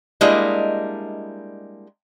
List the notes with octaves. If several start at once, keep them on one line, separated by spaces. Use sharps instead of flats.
G3 G#3 A#3 D4 E4 D#5